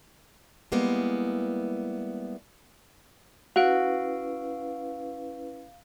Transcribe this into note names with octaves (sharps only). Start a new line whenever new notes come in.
G3 G#3 A#3 B3 E4
C#4 E4 F#4 B4 F5 D7